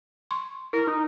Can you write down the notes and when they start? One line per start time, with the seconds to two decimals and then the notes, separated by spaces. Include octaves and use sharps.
0.31 C6 C#6
0.73 E4 A#4
0.87 D#4